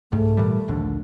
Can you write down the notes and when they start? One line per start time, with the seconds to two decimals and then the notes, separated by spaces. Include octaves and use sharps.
0.12 C2 G#2 A3
0.37 A#2 E3 G3
0.68 A#1 D#2 D3